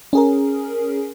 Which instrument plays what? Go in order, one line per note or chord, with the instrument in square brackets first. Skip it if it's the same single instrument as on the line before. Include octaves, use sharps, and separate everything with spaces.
[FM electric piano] C#4 G#4 A#4